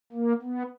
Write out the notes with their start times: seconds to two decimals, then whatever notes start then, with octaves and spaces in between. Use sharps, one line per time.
0.12 A#3
0.42 B3